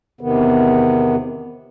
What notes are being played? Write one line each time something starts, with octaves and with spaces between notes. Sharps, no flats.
E2 C3 D#3 B3